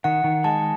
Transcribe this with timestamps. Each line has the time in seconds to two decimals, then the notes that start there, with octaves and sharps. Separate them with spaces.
0.04 D#3 F#5
0.24 D#3
0.44 G#3 A5